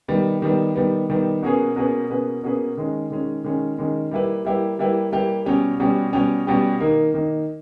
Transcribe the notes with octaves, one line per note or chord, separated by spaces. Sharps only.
D#3 G3 B3
D#3 G3 B3
D#3 G3 B3
D#3 G3 B3
B2 A#3 C#4 G#4 B4
B2 A#3 C#4 G#4 B4
B2 A#3 C#4 G#4 B4
B2 A#3 C#4 G#4 B4
D#3 G#3 C#4
D#3 G#3 C#4
D#3 G#3 C#4
D#3 G#3 C#4
G3 A#3 E4 G4 B4
G3 A#3 E4 G4 B4
G3 A#3 E4 G4 B4
G3 A#3 E4 G4 B4
B2 G3 C#4 G4
B2 G3 C#4 G4
B2 G3 C#4 G4
B2 G3 C#4 G4
D#3 A#3 D#4
D#3 A#3 D#4